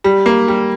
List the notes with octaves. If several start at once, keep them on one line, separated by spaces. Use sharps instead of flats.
G3
A#3
G3